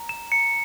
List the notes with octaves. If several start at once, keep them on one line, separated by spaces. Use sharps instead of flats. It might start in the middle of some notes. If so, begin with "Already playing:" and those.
Already playing: A#5
E7
A#5 C#7